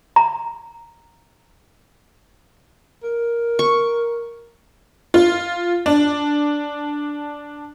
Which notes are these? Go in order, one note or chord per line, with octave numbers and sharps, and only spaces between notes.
A#5
A#4
C#6
F4
D4